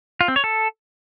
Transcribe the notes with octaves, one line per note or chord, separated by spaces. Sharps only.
F4
C4
C#5
A4